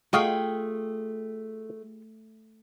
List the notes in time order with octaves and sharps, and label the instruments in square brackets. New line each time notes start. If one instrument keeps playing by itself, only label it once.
[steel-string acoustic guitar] A3 [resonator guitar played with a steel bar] F4 G#4 G5 [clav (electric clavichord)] F#4 D#5 F5